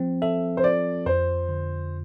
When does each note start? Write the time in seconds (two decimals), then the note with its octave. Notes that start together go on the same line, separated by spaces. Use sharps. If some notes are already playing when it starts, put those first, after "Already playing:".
Already playing: F3 C4
0.22 A4 E5
0.57 C5
0.64 F4 D5
1.06 F2 C5
1.49 D3